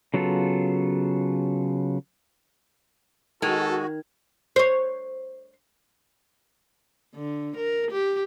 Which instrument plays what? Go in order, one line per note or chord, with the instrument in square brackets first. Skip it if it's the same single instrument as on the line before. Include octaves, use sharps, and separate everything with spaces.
[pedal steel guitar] C#3 F#3 B3 F4 A4
[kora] D#3 [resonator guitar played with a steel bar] G#3 [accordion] F#4 [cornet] A4
[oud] C5 C#5
[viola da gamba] D3
A#4
G4